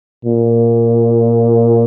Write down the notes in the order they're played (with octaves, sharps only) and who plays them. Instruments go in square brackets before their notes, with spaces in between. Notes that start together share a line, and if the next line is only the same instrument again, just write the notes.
[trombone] A#2